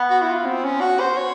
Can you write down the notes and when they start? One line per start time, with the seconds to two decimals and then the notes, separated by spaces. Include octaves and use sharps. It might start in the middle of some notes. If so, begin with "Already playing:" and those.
Already playing: B3
0.10 F#4
0.22 E4
0.29 F4
0.46 C4
0.65 C#4
0.81 F#4
1.00 C5
1.17 C#5